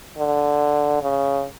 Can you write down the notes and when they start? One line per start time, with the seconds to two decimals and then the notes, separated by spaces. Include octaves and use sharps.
0.18 D3
1.01 C#3